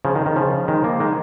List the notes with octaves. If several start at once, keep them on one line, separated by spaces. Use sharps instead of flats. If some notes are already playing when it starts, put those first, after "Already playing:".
C#3 F3
D#3
D#3
C#3 F3
D#3 G#3
F3 A#3
D#3 G#3